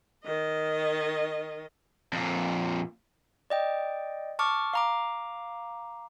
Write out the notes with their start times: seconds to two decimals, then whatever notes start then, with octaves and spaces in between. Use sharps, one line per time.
0.24 D#3 D#5
2.13 F2 A#2
3.50 D5 D#5 G5
4.39 A5 C#6 D6 F6
4.73 F5 A#5 D6